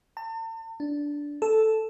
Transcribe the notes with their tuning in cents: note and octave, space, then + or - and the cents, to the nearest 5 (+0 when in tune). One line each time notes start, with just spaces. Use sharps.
A5 +45
D4 -10
A4 -5